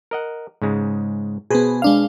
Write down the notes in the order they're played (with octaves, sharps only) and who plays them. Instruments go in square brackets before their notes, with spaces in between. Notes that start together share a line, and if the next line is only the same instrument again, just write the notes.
[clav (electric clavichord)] A#4 D#5 F#5
G#2 C#3 G#3
[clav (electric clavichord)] B2 B4 C5 [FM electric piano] B3 G#4
[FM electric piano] G#3 D4 F5